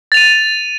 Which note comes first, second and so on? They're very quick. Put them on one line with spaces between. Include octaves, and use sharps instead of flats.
A6 F7 D#7